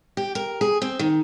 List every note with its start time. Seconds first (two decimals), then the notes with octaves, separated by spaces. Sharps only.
0.17 G4
0.35 A#4
0.61 G#4
0.82 C4
0.99 D#3